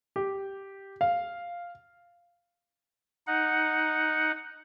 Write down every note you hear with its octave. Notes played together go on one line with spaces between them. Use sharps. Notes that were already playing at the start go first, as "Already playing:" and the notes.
G4
F5
D#4 F#5